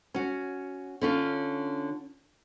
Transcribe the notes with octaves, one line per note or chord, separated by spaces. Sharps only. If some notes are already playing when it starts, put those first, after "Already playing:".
C#4 F#4
D3 C#4 F4